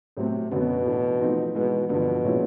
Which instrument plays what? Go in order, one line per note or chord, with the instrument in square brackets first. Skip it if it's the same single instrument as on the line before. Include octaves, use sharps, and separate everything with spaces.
[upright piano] A2 F#3 A3 C4 [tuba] C3
[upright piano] F#2 D3 F#3 B3 [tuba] B2
[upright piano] A2 E3 A3 D4
F3 A3 C4 D#4
[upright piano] G#2 E3 G#3 [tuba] B2
[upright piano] G2 D3 F3 [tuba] B2
[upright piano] A#2 F3 G#3 C#4 E4